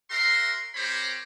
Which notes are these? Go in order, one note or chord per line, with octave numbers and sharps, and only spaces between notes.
F#4 A#4 E5 C6
C4 G4 A#4 C5 C#5 B5